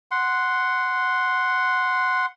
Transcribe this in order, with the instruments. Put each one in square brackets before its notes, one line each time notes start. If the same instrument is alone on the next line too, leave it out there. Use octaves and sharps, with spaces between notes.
[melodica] F#5 C6